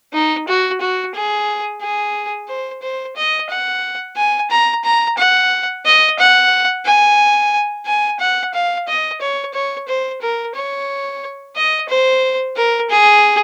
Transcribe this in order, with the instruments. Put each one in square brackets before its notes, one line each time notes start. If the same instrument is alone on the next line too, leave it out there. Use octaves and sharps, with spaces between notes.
[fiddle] D#4
F#4
F#4
G#4
G#4
C5
C5
D#5
F#5
G#5
A#5
A#5
F#5
D#5
F#5
G#5
G#5
F#5
F5
D#5
C#5
C#5
C5
A#4
C#5
D#5
C5
A#4
G#4